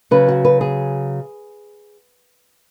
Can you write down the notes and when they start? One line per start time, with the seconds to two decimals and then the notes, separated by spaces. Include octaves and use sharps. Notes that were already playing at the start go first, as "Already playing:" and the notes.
0.11 C#3 F#3 B4
0.28 F#4
0.45 B4
0.61 G#4